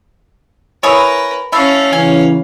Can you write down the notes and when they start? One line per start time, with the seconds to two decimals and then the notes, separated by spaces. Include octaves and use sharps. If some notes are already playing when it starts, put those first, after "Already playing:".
0.83 E4 G#4 A#4 B4 C#5
1.52 A3 C#4 E4 F5
1.93 C#3 E3 G#5